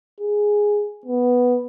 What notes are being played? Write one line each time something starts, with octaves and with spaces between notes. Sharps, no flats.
G#4
B3